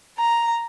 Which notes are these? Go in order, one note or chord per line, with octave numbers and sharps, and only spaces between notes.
A#5